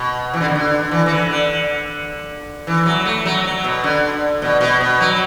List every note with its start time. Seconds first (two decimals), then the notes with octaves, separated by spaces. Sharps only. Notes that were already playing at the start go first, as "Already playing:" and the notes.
Already playing: B2
0.34 E3
0.41 D3
0.48 B2
0.55 D3
0.91 E3
1.06 E3
1.10 D3
1.31 D3
2.67 E3
2.86 F#3
3.05 A3
3.26 F#3
3.44 F#3
3.64 B2
3.84 D3
4.42 B2
4.61 B2
4.81 B2
5.01 F#3